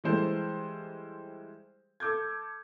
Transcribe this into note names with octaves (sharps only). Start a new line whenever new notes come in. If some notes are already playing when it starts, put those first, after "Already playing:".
E3 G3 G#3 A4 C5
A4 D6 G6 G#6